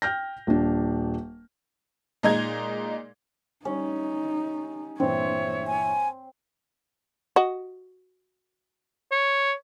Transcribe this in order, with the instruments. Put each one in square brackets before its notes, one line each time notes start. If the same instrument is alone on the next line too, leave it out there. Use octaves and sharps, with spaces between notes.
[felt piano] G5 F6 G6 A#6
D#1 D4
[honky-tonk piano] A#2 G#3 D#4 A#5 G#6
[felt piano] G3 [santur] C#4 [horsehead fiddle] D#4
[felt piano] A#1 G2 E3 [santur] C4 [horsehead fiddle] C#5 E5
[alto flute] G#5
[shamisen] F#4 D#5
[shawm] C#5